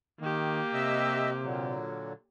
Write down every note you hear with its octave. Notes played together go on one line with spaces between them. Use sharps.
D#3 A#3 G4
C3 D#5 E5 E6
A#2 D3 F#3